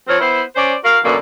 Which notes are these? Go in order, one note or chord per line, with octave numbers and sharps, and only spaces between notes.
F3 C4 A#4 C#5
B3 E4 C5
C#4 C5 D5
F#4 A#4 F5
F#2 B2 D3 A#3